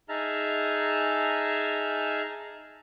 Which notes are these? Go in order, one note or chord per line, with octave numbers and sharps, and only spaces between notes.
D#4 G#4 E5 A5 A#5 F6